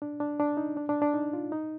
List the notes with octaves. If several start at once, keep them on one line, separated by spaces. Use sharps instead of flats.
D4
D4
D4
D#4
D4
D4
D4
D#4
F4
D#4